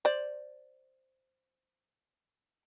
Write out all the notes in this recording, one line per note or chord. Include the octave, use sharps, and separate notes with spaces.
C5 D5